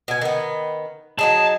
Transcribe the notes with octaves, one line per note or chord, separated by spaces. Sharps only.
B2 G#5
D#3 B3
F#3 D#4 G#4 A5